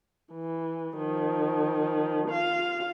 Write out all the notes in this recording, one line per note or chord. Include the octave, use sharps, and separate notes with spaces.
E3
D#3 F3
F4 F5